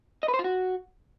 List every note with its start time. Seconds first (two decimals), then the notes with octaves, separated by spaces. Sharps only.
0.23 D#5
0.28 B4
0.34 C5
0.39 F4
0.44 F#4